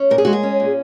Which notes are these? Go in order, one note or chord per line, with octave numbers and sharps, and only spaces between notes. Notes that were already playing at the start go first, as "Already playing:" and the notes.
Already playing: C#4
A#2 A#4
G#4
G#3 F#4
G#4
C#4
A#2